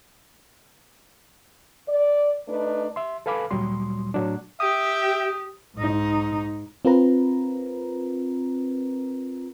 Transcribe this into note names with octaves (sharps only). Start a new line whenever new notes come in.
D5
A3 D4 D#4 B4
E5 C6
A4 B4 F5 G#5 B5 D6
D2 A#2 F#3 G3 C6
A2 F#3 D4
G4 E5 G5 D#6
G#2 D#4
C4 F4 A#4 B4 A#5